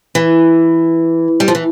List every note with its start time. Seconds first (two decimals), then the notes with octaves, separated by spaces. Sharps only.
0.15 E3
1.40 G3
1.48 F3
1.55 E3